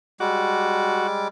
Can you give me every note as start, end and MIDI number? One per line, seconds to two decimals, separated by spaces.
0.20 1.28 55
0.20 1.28 56
0.20 1.07 66
0.20 1.28 86